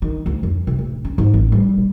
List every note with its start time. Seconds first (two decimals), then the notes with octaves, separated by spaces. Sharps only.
0.02 D#3
0.26 D2
0.43 F2
0.67 C3
0.79 D1
1.05 C#4
1.18 G#2
1.34 A1
1.52 G3
1.77 A#2